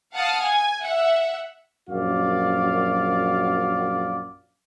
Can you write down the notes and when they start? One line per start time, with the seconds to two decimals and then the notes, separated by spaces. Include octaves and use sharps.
0.13 F5 F#5 A5 D#6 F6
0.42 G#5
0.82 E5 F#5
1.89 A#1 F#2 F#4 D5 F5